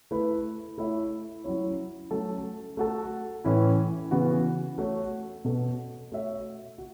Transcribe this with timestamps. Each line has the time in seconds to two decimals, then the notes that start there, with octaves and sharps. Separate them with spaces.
0.11 A3 E4 B4
0.78 A3 E4 C#5 E5
1.44 F#3 C#4 E4 C#5
2.11 F#3 A3 C#4 A4
2.77 A3 F#4 A4
3.44 A2 E3 C#4 E4
4.11 C#3 E3 B3 F#4
4.78 A3 F#4 C#5
5.44 B2 B3 A4
6.12 A3 F#4 C#5 E5
6.78 F#4